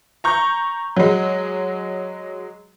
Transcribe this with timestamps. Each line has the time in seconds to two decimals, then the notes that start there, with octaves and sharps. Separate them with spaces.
0.24 A#5 C#6 G6
0.97 F#3 G#3